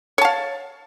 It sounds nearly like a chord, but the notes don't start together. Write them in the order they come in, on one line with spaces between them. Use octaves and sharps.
C#5 A5 F5